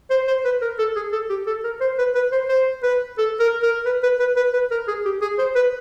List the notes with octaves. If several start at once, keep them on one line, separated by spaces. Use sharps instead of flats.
C5
C5
B4
A#4
A4
G#4
A4
G4
A4
A#4
C5
B4
B4
C5
C5
B4
A4
A#4
A#4
B4
B4
B4
B4
B4
A#4
G#4
G4
G#4
C5
B4